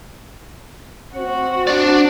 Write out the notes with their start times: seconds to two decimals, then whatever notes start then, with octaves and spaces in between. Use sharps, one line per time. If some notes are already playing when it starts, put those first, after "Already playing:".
1.15 C4 F#4
1.67 D4 D5